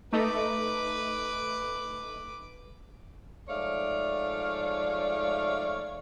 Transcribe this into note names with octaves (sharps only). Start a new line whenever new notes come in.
A3 D#4 B4 D6
G#2 F3 A3 C#5 D5 F5